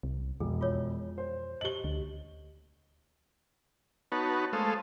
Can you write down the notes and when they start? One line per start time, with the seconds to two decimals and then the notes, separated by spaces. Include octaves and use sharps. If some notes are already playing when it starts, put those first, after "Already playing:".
0.03 C2
0.40 E1 F2 G#4
0.61 F4 G#4 C#5
1.18 C5
1.61 G4 D#5 F#7 G7
1.84 D2
4.12 B3 D#4 F#4 B4 C#5 A5
4.53 G#3 A3 A4 C5 F5 D#6